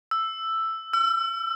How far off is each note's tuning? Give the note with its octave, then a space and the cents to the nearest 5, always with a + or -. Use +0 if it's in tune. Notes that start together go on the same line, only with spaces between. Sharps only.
E6 +5
E6 +45